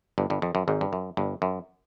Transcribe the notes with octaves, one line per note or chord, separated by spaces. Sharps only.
G1 G2
G1 G2
F2
F#2
G#1 G#2
G2
F#2
G1 G2
F#2